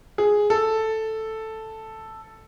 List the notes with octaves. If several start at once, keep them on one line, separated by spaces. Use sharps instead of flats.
G#4
A4